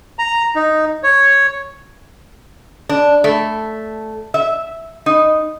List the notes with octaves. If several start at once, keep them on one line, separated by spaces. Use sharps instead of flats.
A#5
D#4
C#5
D4
A3
E5
D#4